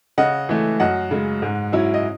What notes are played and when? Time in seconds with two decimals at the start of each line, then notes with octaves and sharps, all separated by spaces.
0.18 C#3 D#5 F#5
0.49 E3 A3
0.80 F#2 D#5 F#5
1.11 C#3 G#3
1.42 G#2
1.72 F#3 C#4 E4
1.94 D#5